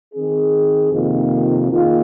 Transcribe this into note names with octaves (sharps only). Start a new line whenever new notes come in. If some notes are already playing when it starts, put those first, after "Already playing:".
D#3 C4 G#4
F2 C3 D#3 A#3 F4
D#3 A#3 F4 G#4